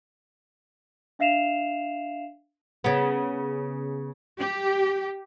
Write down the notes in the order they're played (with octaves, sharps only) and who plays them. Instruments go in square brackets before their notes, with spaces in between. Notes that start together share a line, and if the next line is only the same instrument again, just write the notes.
[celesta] D4 E5 F5 C7 E7 F7
[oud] C#3 B3
[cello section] G4